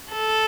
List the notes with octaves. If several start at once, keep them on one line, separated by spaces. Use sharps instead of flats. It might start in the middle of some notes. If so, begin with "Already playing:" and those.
A4